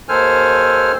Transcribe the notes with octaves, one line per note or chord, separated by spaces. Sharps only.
D#2 D#3 A4 C5 G#5 F6